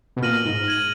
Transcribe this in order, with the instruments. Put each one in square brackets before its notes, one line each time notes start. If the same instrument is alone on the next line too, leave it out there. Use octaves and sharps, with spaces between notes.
[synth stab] B2
[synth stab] A#2 [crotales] F6 A#6 D#7 F#7
[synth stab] G#2
[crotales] G#6 D#7 F#7